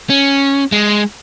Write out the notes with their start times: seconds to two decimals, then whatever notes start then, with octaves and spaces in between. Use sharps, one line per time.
0.10 C#4
0.72 G#3